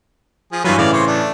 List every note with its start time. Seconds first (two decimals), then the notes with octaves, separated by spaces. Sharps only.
0.52 F3 G#4
0.64 G2 E3 F#3 F4 B4 G#5
0.78 A2 C#3 E3 D5 F5
0.93 C5 C#5 D6
1.07 A3 D4